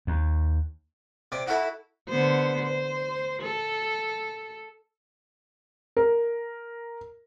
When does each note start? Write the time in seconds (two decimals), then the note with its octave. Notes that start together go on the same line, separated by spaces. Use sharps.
0.07 D#2
1.32 C3 D5
1.47 E4 F#4 A4
2.09 D3 B3 C5
2.65 C5
3.42 A4
5.97 A#4